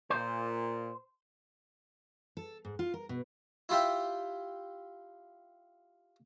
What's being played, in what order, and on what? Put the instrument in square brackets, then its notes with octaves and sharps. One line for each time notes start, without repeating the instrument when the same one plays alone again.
[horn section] A#2 [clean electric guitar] C5
[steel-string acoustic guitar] A4
G#2
F4
A#4
B2
[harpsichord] E4 F4 G4 E5